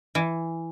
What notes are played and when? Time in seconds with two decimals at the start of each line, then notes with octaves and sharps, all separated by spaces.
0.15 E3